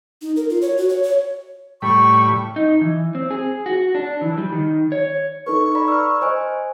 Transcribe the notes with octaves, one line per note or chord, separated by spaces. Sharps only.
D#4
A#4
F4
C#5
F#4
C#5
C#5
A2 G3 B5 C#6
D#4
E3
C4
G#4
F#4
D4
E3
G3
D#3
C#5
D#4 A4 B4 C#6
D5 A#5 B5
E6 F6
C5 D#5 G#5